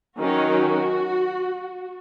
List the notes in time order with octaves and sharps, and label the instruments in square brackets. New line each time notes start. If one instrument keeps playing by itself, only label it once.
[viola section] D#3 F#3 C#4 F#4